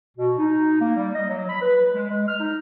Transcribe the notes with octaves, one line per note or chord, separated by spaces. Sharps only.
B2
D#4
A#3
G3
D#5
F#3
B5
B4
G#3
G#3
F6
D#4